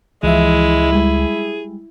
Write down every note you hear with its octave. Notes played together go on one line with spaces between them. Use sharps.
C#2 E3 F3 G#3 E4 E5
G3 G#3 G#4